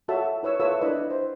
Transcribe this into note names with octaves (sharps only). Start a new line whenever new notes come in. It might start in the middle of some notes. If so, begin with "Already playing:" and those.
F4 F#4 A4 C#5 E5 A5
E4 B4 C#5 E6
F4 A4 B4 C#5 E5 E6
D4 E4 B4 D5 D#5
C5